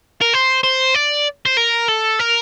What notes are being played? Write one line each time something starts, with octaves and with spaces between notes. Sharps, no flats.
A#4
C5
C5
D5
C5
A#4
A4
A#4